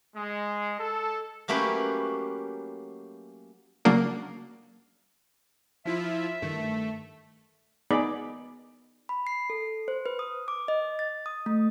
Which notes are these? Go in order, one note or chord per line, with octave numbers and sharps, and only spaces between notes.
G#3
A4
F#3 A3 A#3 C#4 G4 B4
C#3 F#3 A#3 D4
F3 E4 F4 E5
G2 D#3 A3
B3 D#4 G#4 D5 B5
B5
C7
A4
C5
B4
D#6
D6
D#5
A6
D#6
A3